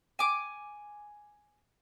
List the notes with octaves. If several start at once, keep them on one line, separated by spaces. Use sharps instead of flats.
G#5 D6